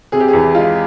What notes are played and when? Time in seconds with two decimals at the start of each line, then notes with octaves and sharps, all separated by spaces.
0.12 C3 G#4
0.20 G4
0.28 G#4
0.33 E2
0.54 G#3 F4